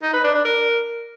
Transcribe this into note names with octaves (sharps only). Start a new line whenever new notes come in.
D#4
B4
D4
D4
A#4